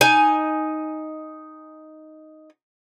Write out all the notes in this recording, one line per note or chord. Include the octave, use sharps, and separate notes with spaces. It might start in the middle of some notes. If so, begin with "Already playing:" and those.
D#4 G#5